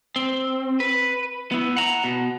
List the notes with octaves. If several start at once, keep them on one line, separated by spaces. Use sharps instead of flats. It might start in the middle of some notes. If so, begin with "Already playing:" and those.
C4
B4
B3 E4
F#5 A#5
B2